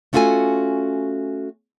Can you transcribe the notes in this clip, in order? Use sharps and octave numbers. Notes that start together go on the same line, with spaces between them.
A3 C#4 F4 F#4 A4 G#5